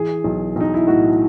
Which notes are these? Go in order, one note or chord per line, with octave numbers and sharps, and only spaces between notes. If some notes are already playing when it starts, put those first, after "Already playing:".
Already playing: E3 G#4
B1
B1 D#4
E4
A2 F#4